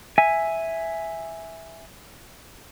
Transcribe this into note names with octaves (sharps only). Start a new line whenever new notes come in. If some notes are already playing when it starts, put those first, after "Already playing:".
E5 G#5